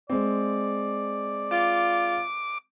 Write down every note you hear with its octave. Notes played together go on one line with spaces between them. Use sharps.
G#3 C4 D5
F4 D6